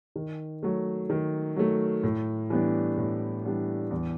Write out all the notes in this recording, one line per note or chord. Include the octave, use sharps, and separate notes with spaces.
D#3
F#3 A3
D#3
F#3 A3
A2
E3 G3 B3 D4
A2
E3 G3 B3 D4
E2